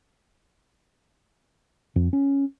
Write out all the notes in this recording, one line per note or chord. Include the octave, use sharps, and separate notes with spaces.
F2
C#4